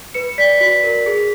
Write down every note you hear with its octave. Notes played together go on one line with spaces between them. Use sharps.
B4 C#7
D5 B6
F#4 B6
A#4
G#4